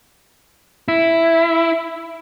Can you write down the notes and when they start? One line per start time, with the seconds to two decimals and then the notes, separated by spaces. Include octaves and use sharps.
0.88 E4